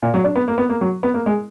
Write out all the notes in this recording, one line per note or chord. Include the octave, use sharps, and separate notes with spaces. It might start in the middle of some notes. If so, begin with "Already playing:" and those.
A#2
F#3
D4
B3
A#3
B3
A#3
F#3
B3
A#3
G#3